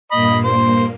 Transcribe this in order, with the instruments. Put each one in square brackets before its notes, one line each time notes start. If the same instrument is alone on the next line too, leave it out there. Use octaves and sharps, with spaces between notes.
[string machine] G2 A#2 A#3 [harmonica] D#5 B5
[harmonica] C5